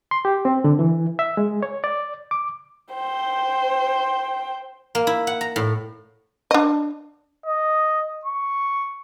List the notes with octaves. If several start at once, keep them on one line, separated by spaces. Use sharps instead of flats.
C6
G4
C4
D3
E3
E5
G#3
C#5
D5
D6
C5 G5
A#3
E4
F#5
A#5
A2
D4 D#5
D#5
C#6